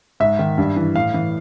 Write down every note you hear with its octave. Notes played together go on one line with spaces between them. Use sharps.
G#2 E5
D#3
G2
E3
A2 F5
E3